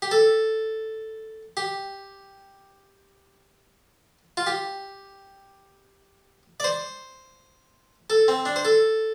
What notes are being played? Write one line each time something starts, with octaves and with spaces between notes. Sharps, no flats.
G4
A4
G4
F4
G4
D5
C5
A4
C4
D4
C5
A4